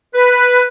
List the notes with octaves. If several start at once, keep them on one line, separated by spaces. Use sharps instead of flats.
B4